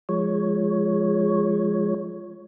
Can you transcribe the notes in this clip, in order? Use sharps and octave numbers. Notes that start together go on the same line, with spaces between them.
F3 G#3 C#5